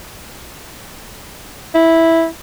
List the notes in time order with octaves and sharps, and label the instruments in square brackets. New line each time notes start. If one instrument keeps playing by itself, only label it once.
[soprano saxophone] E4